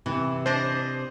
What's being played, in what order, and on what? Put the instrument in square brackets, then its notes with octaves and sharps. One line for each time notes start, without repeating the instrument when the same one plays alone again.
[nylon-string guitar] C3 [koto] E3
[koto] D4 D#5 [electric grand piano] C5